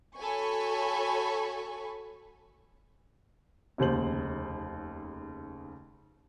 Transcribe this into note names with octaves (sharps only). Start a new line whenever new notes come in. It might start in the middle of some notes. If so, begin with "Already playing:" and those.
F#4 A4 C#5 G#5 B5 C#6
F1 D#2 C#3 C5 F#7